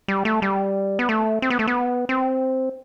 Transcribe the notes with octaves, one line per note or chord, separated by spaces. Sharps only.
G3
A3
G3
B3
A3
C4
B3
A3
B3
C4